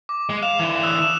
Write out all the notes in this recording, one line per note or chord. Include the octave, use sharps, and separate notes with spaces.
D6
G#3
F5 E7 F7
D3 E3
D#6 E6 F#6
E7